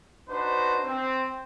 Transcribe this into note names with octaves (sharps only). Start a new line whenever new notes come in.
D4 D#4 F#4 B4 C5
C4